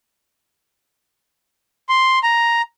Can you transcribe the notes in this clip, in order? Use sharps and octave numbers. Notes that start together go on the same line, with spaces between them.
C6
A#5